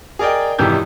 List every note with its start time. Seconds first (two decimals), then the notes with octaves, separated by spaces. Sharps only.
0.19 G#4 A#4 D5 D#5 G5
0.59 G#1 F2 C3 E3 G4 G6